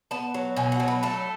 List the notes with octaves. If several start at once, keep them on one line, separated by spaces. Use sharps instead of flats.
B3 A5
F#3
B2 G#5
F#5
F#3
B4
A3 A4